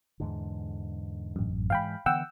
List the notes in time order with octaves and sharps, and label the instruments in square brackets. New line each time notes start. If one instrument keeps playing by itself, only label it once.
[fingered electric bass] E2 G#2 D3
[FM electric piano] A1 F#2
[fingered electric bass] G#2 E3 G#3 [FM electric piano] F5 G5 B5
[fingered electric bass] D3 E3 B3 [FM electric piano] F#5 G5 E6